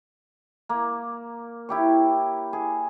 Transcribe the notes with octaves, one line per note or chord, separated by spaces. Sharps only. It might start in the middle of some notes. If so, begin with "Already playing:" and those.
A#3
E4 G4 C#5
G#4